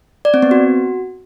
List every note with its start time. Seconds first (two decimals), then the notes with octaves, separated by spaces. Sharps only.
0.25 D5
0.34 C4
0.42 B3
0.51 F#4